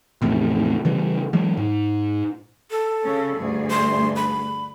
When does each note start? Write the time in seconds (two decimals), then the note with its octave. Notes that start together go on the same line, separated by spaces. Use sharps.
0.22 A#1 E2 A2 C3
0.85 C#3 E3 G3
1.33 E3 F#3 G#3
1.57 G#2
2.71 A4
3.05 C#3 C#4
3.37 D2 G2 G#4
3.70 C6
4.16 B5